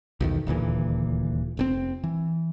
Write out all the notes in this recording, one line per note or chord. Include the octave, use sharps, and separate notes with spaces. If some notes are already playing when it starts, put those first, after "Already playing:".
B1 E2 D#3
D#1 D2 A#2 E3
F1 B2 C4
E3